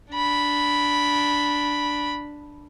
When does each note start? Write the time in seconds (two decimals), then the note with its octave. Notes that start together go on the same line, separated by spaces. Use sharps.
0.13 D4 B5